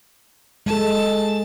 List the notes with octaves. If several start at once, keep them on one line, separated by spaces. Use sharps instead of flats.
G#3 A4 A5